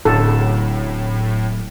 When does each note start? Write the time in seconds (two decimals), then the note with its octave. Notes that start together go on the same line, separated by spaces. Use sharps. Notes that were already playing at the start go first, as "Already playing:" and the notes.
0.05 D1 D2 A2 C#3 F#3 A4